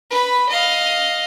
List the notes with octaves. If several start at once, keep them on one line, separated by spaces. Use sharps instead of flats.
B4 B5
D#5 F5